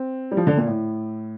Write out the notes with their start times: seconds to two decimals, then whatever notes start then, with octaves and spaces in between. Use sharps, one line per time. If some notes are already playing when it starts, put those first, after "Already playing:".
Already playing: C4
0.31 G3
0.37 F3
0.47 D3
0.57 A#2
0.67 A2